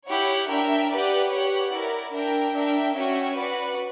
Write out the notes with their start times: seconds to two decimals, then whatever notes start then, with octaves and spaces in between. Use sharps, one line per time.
0.08 E4 G4 C#5 F#5
0.49 D4 A#4 E5 G5
0.90 G4 B4 D5 F#5
1.31 G4 C#5 F#5
1.72 E4 A#4 D5
2.13 D4 A#4 E5 G5
2.54 D4 A#4 E5 G5
2.95 C#4 F#4 C#5 E5 G5
3.37 F#4 B4 D5 F#5